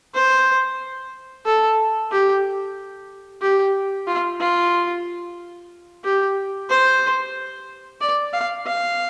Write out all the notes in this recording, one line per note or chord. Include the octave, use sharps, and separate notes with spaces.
C5
A4
G4
G4
F4
F4
G4
C5
D5
F5
F5